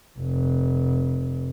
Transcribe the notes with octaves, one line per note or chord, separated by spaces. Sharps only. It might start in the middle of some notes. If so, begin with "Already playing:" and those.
F1